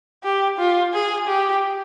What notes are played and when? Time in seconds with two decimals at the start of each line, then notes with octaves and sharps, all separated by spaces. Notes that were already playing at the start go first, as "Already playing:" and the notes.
0.24 G4
0.58 F4
0.94 G#4
1.28 G4